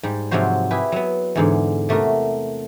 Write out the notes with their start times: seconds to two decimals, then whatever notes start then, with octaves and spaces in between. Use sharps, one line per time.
0.03 G#2 G3
0.31 G#2 C3 F3 F#3 F#4 C5
0.71 E4 G4 G#4 B4
0.92 F#3 B3
1.36 E2 G#2 D3
1.89 C3 A3 F#4 A#4